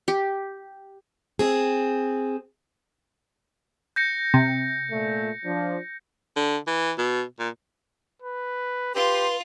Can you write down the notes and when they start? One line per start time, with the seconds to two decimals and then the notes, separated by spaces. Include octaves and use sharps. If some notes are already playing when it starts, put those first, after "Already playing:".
0.08 G4
1.39 C4 G#4
3.96 G6 A#6 C#7
4.34 C3
4.90 A#2 A3
5.45 F3 D4
6.36 D3
6.67 E3
6.98 B2
7.39 A#2
8.22 B4
8.95 F4 G4 B4 C6